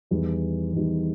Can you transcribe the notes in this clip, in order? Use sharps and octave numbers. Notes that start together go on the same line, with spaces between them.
E2 D#3 G3
E2 D#3 G3